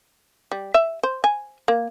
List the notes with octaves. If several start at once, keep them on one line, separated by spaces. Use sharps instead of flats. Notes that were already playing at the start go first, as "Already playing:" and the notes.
G3
E5
C5
G#5
A#3